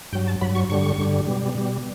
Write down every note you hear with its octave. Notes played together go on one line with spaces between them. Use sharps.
G2 F#3 G5
A5
G2 F#3 B5
C#6
G2 D3 G3 C#6
G2 D3 G3
B2 G3
B2 G3